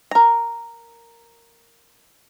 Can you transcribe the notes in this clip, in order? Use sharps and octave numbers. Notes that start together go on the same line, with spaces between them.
A#4 A#5